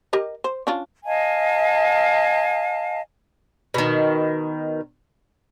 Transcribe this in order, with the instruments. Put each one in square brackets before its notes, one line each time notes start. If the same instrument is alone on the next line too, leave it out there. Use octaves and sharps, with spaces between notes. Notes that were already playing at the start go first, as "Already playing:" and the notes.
[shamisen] G4 A#4 D#5
C5
C#4 D4 F4
[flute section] D#5 F5 G#5 A5
[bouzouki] B2 D#3